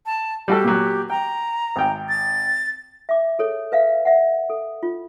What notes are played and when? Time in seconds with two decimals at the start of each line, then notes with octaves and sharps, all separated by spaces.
0.06 A5
0.48 G3 F#4 G4 A4
0.64 A#2 F#3
1.10 G5 A#5
1.76 G#1 G5
2.09 A6
3.09 E5 D6
3.39 G#4 A4 C#5
3.72 B4 E5 F5
4.05 E5 F#5
4.50 A4
4.83 F4